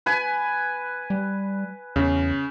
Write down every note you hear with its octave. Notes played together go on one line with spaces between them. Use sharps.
B4 G#5
G3
E2 C#3